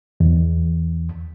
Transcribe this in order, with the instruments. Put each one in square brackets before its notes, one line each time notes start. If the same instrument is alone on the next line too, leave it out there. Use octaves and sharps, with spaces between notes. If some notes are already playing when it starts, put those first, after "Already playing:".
[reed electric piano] E2